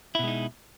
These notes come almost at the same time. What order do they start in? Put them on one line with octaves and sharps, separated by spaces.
E4 B2 G#3 D#4